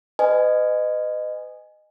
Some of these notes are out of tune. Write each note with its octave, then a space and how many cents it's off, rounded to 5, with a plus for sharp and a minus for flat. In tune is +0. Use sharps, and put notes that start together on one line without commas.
B4 +40 D#5 -15 G#5 +0